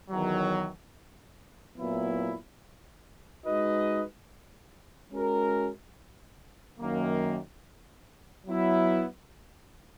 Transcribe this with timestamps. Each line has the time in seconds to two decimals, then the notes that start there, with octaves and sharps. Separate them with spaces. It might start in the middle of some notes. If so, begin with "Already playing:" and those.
0.11 E2 D#3 F#3
1.77 A#2 F#3 B3 E4
3.45 G#3 D#4 F#4 B4 D#5
5.12 G#3 C#4 F#4 A#4
6.79 F#2 D#3 A#3
8.47 F#3 B3 E4